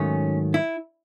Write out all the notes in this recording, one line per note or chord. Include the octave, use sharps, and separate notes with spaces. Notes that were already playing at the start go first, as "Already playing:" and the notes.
Already playing: G#2 D#3 F#3 A3 C#4
E4